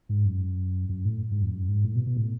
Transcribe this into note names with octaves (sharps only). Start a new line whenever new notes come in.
G#2
F#2
F#2
A2
G#2
F2
F#2
G#2
A2
B2
B2
A2